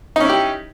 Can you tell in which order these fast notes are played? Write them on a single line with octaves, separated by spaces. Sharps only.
D#4 C#4 E4 G4